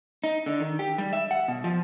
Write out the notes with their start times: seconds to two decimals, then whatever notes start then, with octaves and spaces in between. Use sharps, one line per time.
0.24 D#4
0.46 D3
0.60 D#3
0.79 G4
0.98 G3
1.13 E5
1.31 F#5
1.48 B2
1.64 F3